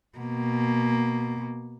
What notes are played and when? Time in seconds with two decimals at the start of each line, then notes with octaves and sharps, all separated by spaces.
0.18 B2 A#3